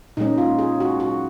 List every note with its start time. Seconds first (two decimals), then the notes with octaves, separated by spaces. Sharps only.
0.17 A#2 G#3 C#4 D#4
0.38 F4
0.59 G#4
0.80 F#4
1.00 F#4